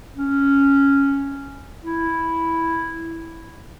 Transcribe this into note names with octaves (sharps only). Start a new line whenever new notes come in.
C#4
E4